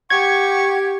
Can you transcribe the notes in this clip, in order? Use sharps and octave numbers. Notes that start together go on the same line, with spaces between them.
G4 F#5 C#6 G#6